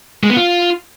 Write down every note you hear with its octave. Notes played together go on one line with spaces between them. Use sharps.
G#3
B3
F4